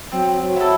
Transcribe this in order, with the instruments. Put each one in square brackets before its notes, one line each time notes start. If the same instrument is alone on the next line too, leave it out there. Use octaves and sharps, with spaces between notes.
[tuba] F#3 [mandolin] C4
[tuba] F#3
[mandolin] E4 A4